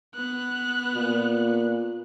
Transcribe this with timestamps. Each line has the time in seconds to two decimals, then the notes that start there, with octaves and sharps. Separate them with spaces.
0.15 B3 F#6
0.95 A#2